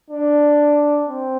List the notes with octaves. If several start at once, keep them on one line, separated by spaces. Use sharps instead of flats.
D4
C4